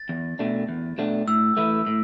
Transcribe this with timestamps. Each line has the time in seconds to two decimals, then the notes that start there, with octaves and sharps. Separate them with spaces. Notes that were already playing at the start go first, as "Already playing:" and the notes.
Already playing: A6
0.09 E2
0.39 B2 A3 D4
0.69 E2
0.98 B2 A3 D4
1.27 A2 E6
1.57 E3 A3 E4
1.87 A2